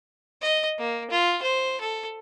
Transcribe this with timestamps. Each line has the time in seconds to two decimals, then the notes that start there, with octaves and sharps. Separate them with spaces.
0.42 D#5
0.79 A#3
1.10 F4
1.42 C5
1.81 A4